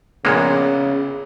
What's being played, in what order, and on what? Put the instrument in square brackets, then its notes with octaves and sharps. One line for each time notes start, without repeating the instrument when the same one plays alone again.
[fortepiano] A#1 B3 A#4 [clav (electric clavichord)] A#2 G#3 A#3 [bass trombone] C#3